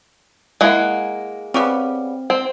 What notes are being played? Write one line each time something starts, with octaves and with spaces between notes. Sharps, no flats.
G#3 A#3 E4 F#5
C#3 G3 B3 C4
C4 C5